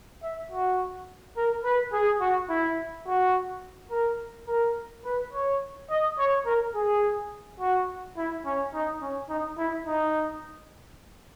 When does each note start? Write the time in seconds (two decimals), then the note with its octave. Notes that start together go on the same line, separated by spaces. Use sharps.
0.22 E5
0.51 F#4
1.37 A#4
1.64 B4
1.93 G#4
2.21 F#4
2.49 E4
3.06 F#4
3.91 A#4
4.47 A#4
5.05 B4
5.33 C#5
5.90 D#5
6.18 C#5
6.46 A#4
6.75 G#4
7.60 F#4
8.17 E4
8.45 C#4
8.74 D#4
9.01 C#4
9.29 D#4
9.57 E4
9.87 D#4